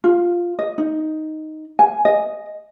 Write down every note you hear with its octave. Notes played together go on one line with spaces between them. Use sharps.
F4
D#5
D#4
G#5
D#5